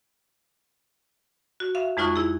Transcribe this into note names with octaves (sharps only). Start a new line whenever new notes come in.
F#4
E5 F5
F2 G#3 D#4 F4 C#6 F#6
E4 G#4